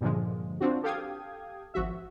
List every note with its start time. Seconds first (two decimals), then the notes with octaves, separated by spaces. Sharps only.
0.01 G2 A#2 D3 F3 G#3
0.60 C4 D4 F4 F#4
0.83 G4 A4 F5 G5 D#6 G#6
1.74 G#1 F3 F#4 E5